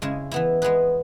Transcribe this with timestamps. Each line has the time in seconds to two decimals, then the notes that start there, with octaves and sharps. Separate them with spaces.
0.02 C#3 G#3 E4
0.31 E3 B3 E4
0.62 G#3 B3 G#4 B4